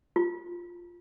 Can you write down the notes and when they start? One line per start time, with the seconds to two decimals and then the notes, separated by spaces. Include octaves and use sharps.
0.16 F4